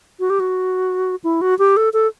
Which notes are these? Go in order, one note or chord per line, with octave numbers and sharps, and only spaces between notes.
F#4
G4
F#4
E4
F#4
G4
A4
A4